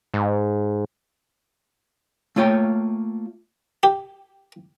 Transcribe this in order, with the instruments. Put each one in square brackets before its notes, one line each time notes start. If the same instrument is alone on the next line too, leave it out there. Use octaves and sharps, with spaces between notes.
[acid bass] G#2
[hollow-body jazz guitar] A3 A#3 F4 C#5 G5
[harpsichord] G4